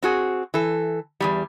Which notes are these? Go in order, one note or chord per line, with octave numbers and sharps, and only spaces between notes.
C4 F#4 G#4
E3 A4
E2 G2 G3